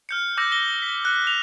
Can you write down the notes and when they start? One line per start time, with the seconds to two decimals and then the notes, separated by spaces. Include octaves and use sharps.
0.09 F6 G6 C#7
0.37 D6 E6 F6 G6 A#6 C#7
0.52 A#6 G7
0.82 B6
1.05 F#6 C#7
1.27 F7